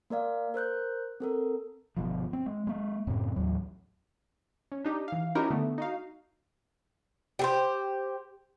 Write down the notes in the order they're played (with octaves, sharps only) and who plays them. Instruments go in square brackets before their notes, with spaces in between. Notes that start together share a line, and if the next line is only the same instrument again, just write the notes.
[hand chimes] A#3 A#4 D5 F5
A#4 C5 F#6 G6
C4 A4 A#4
[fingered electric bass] G1 B2 F3
C4
G#3
G#3 A#3
F#2 A2 C#3 C4
A1 D#2 F#3
[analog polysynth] C#4
D4 D#4 G4
E3 F5
C#4 D#4 E4 F#4 G4 A#4
D3 A3 B3
D#4 F#4 F5
[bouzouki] G4 G#4 C5